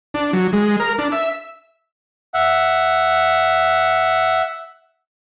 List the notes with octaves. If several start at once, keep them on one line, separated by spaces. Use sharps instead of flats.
D4
F#3
G#3
A#4
D4
E5
E5 F#5